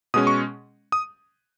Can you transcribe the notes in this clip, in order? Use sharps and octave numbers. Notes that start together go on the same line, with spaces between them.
B2 G#3 C#4 D#6
C#6
D#6